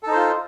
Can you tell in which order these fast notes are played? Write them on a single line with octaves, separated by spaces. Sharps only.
A4 D#4 C5 F4